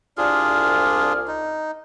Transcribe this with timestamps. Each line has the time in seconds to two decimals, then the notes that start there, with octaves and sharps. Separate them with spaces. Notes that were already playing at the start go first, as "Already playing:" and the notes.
0.18 C2 D4 F4 G#4 D5 F6
1.28 D#4